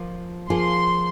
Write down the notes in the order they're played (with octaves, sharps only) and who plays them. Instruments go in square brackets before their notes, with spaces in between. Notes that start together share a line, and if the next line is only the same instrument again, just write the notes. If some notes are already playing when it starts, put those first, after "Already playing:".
Already playing: [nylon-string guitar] F3 A#3 F4
[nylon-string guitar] F3 A#3 F4 G#4 [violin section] C6